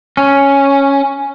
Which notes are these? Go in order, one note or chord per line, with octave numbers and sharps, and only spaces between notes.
C#4